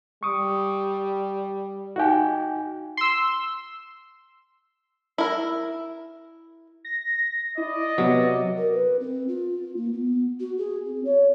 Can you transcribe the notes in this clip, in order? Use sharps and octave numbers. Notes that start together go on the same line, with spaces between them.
G3 C#6 D#6
D#4 F#4 F5 G5 G#5
C6 E6
E4 A#4
A#6
E4 D5 D#5
C3 F#3 B3
A#4
B4
C4
F4
A#3
B3
F#4
G#4
C4
C#5